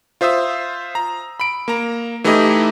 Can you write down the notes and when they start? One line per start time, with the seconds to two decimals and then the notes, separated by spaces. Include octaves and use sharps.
0.21 F4 C5 E5 D#6 E6
0.95 A#5
1.40 B5 D7
1.68 A#3 A#5
2.24 E3 A3 D#4 E4 G4 D#5